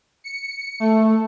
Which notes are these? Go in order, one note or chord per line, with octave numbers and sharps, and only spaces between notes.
C#7
A3